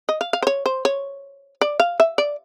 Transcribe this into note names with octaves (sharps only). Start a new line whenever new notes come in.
D#5
F5
F5
C5
C#5
C5
C#5
D5
F5
E5
D5